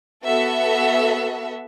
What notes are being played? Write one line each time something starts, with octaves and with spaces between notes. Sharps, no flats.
B3 F#4 A4 E5